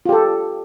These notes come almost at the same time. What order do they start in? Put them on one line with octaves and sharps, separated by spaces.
F4 G4 A4